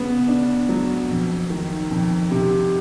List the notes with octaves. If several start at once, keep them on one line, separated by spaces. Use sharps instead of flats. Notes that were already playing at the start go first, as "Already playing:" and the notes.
Already playing: C#3 B3
D4
F#3
F2
D#3
F2
C3